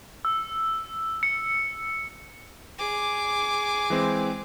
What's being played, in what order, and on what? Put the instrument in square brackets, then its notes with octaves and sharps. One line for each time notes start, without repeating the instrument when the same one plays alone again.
[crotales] E6
C#7
[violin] G#4 D6
[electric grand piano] E3 G#3 C4